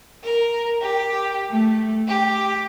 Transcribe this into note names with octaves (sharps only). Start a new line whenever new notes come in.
A#4
G4
A3
G4